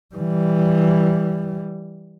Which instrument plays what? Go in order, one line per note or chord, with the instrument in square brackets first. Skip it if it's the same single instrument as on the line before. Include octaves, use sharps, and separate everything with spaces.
[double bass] E3 G3